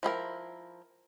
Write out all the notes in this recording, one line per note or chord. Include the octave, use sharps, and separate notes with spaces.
F3 E4 G#4 A#4